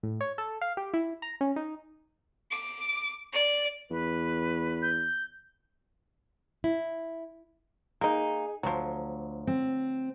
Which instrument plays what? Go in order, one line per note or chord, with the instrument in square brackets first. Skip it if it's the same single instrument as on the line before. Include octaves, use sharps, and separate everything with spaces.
[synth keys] A2
C#5
A4
F5
G4
E4
A#5
C#4
D#4
[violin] D6
D5
[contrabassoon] E2 [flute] B4
[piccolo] G6
[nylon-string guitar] E4
[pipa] A#3 D#4 [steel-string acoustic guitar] G#4
[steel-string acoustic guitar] D2 [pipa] F3 F#3
[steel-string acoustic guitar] C4